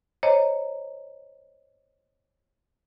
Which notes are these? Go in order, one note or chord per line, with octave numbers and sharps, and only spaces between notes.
C5 C#5 D#5 A#5